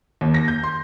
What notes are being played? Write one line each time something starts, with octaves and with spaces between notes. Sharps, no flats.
D#2
A#6
G6
C6